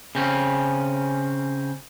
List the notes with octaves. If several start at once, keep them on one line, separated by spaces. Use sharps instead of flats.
C#3 C4 C#4